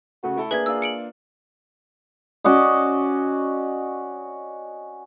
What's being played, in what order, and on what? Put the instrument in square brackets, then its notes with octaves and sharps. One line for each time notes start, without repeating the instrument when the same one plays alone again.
[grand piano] C#3 A3 [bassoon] F#4
[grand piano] A3 E4 A4
[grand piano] A#3 D4 F#7 [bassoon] G#4 [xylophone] B4 E5 G#6
[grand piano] A#3 D4 F4 [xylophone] E6
[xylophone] C#7 D7 F#7
[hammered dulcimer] C#4 F#4 D5 D#5